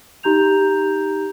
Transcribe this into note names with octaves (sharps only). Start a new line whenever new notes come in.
D#4 G4 A#5 G6 F7